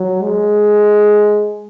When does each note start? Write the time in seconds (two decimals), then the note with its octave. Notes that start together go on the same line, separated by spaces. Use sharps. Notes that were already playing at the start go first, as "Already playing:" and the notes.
Already playing: F#3
0.23 G#3